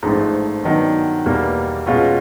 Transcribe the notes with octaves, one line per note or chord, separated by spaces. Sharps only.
A1 G#2 F3 A3 D4
G2 D#3 F#3 B3 D#4
E2 B2 G3 A#3
B2 G#3 C#4 F4